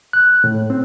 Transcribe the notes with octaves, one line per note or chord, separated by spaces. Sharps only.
F#6
A2
C4